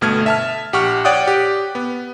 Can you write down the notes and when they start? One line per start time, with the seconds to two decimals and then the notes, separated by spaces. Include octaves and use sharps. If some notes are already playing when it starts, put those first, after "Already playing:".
0.01 G1 B2 A3 F6 G#6
0.26 E5 A5 F6
0.73 A#1 G4 F#5 C#6 F6
1.05 C#5 D5 F#5 G5 D#6 F#6
1.27 G4
1.75 B3